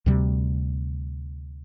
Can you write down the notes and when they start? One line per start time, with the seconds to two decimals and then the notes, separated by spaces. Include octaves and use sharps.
0.06 D2 C3 G3